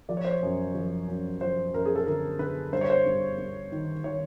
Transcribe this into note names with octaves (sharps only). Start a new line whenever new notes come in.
F3 D5
C#5
C5
C#5
F#2
F3
F#2
F3 C5
F#2 A#4
G#4
A4
D3 A#4
D3 B4
G2 C5
C#5
C5
G2
G2
D#3
D#3 C#5